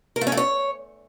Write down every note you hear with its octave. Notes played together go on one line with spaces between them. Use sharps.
A#4
A3
C#4
A3
C#5